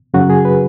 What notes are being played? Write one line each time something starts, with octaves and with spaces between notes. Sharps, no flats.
F#2 C#3 F#3 F#4
G#4
B4